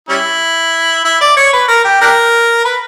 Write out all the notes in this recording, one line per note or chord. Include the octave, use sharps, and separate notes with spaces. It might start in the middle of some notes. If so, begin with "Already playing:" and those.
G3 C#4 E4
E4
D5
C#5
B4
A#4
G4
D4 G4 A#4
B4